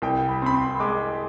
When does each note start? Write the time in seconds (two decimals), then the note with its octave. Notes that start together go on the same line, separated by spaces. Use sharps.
0.02 C2 G5
0.29 B5
0.42 C4 B5
0.54 C6
0.80 G#3 D6